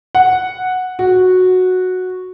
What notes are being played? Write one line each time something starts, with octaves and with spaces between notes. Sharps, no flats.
F#5
F#4